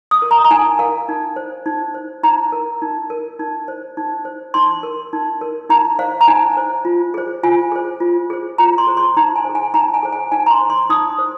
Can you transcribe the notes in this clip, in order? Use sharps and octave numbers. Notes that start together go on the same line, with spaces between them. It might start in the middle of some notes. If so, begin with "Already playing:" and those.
D#6
A#4
A#5
A#5
D#4 G#5
A#4 F5
D#4
C5
D#4
C5
D#4 A#5
A#4
D#4
A#4
D#4
C5
D#4
C5
D#4 C6
A#4
D#4
A#4
D#4 A#5
C5 F5
A#5
D#4 G#5
C5
F4
G#4 C5
F4 G#5
G#4 C5
F4
G#4 C5
F4 A#5
C6
G#4 C5
C6
D#4 A#5
G#5
G#4 C5
G#5
D#4 A#5
G#5
G#4 C5
G#5
D#4 G#5
A#5
C6
C5
C6
D#4 D#6
C5